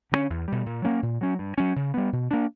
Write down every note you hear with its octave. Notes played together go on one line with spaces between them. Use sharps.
D3 F#3 C#4
E2
B2 G3
A#2
F#3 A#3 C#4
A#2
F#3 C#4
G2
F#3 C#4
C#3
G3 B3
B2
A#3 D4